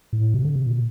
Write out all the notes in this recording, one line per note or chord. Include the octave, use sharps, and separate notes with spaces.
A2
C3
D3
C3
A#2